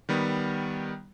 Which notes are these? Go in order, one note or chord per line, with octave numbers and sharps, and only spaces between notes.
D#3 G3 B3